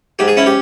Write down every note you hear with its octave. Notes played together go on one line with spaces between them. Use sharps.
G#2 G4
G#4
C#4 E4
G4